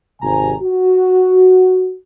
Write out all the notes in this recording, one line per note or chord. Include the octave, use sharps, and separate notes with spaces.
G#1 C3 G#5 A#5
F#4